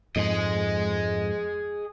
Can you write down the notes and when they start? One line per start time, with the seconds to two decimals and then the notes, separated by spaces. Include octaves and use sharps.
0.16 F2 G#2 G#4 D#5